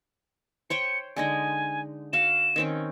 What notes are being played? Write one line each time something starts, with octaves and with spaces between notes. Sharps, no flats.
C5 C#5 G5 C#7
D3 G#3 D#4 G#5
F#4 F5 E7
D#3 C4 C#4